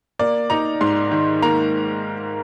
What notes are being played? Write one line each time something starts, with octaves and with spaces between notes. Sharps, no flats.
A#3 D5
D#4 A#5
G#2 C6
D#3
A#3 A#5